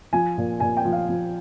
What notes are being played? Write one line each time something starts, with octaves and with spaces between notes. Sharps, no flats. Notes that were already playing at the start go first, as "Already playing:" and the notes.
F3 G#5
A#2
A#2 G#5
G5
F3
F5
F3